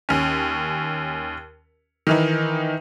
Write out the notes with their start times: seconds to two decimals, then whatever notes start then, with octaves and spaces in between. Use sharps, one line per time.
0.09 D#2 C#4
2.07 D#3 E3 D#4